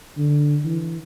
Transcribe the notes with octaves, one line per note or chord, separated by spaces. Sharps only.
D3
E3